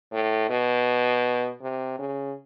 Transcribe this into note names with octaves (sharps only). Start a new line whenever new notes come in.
A2
B2
C3
C#3